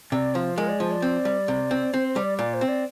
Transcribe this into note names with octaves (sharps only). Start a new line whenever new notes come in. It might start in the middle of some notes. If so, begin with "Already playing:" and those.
C3 D5
F3 C5
G#3 A#4
D5
F3 C5
D5
C4
G3
C3
C4
C4 C5
C5
G3
D5
A#2 D5
C5
C4
D5